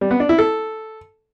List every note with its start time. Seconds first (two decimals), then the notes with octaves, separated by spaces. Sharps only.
0.01 G3
0.11 B3
0.20 D4
0.29 E4
0.39 A4